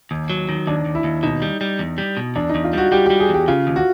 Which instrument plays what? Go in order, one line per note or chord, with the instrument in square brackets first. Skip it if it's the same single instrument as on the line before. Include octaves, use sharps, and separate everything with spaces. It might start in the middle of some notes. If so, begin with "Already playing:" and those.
[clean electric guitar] D#2
F#3
D#3
[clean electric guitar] D#2 [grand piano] D4
[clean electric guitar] D#2
[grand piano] E4
[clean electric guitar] D#2
[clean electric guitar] B2 [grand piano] D#4
[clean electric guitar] G3
G3
E2
G3
B2
[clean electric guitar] E2 [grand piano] D4
[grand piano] D#4
[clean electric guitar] E2
[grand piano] F4
[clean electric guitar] G3 [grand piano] F#4
[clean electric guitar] G3 [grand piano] G4
[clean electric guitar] G3 [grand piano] G4
[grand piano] G#4
[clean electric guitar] E2
[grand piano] G4
[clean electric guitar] C#3 [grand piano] F4
[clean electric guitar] D#2
[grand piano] F#4